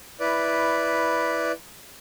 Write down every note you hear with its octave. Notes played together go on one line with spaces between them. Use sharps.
E4 B4 D5